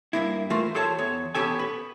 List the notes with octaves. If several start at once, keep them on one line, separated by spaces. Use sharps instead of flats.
G2 A#3 E4
E3 A3 F4 A#4 C5
G4 A4 C5 C#5 A5
E2 C#5
B3 C#4 G4 A4 G#5
B4